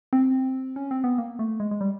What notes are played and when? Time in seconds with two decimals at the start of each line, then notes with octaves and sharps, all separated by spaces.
0.13 C4
0.76 C#4
0.91 C4
1.04 B3
1.18 A#3
1.39 A3
1.60 G#3
1.71 G#3
1.81 G3